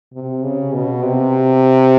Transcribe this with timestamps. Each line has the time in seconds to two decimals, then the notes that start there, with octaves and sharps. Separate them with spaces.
0.14 C3
0.43 C#3
0.73 B2
1.03 C3